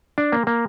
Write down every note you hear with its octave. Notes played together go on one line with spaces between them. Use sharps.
D4
A#3
A#3